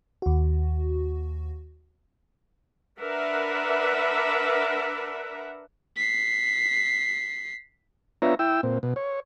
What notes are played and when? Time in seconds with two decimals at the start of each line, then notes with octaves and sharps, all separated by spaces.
0.22 D#2 F#4
3.01 D4 A#4 B4 E5 F#5
5.97 B6 C7
8.22 B3 D4 F4 C#5 E5 A#5
8.39 E4 G5 E6
8.63 A#2 C4
8.83 B2
8.96 C#5